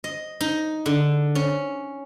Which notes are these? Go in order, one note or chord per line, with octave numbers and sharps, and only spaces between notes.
D#5
D#4
D3
C#4